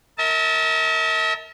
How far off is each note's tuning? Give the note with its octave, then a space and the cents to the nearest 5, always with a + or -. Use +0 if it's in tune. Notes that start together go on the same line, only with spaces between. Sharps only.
A#4 -15 E5 -45 A5 +0